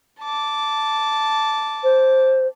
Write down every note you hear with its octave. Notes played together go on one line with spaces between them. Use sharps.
A5 D6
C5